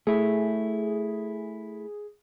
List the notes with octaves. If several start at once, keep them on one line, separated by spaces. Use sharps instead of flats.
A3 E4 G#4